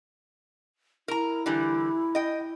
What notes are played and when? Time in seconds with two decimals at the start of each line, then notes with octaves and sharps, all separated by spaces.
1.08 E4 A#4 A#5
1.46 D3 E3 G3
2.15 D#5 G5